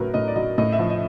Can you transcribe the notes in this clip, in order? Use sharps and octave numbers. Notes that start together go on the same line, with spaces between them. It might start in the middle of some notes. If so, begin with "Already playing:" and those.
Already playing: A2 F#3 A#4 B4
A2 D#5
D5
F#3 D#5
A2 D#5
E5
F3
D#5